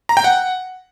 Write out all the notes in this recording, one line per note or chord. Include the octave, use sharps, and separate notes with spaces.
A#5
G5
F#5